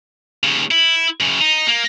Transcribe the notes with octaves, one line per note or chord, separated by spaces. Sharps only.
D#2 C#3
E4
F#2 C#3
D#4
A#3